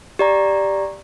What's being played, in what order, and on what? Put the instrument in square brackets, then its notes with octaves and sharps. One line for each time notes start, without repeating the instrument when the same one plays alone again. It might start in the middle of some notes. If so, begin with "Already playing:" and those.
[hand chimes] G4 D5 A#5